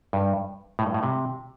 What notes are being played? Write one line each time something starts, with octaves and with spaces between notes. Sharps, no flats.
G2
A2
G2
A2
C3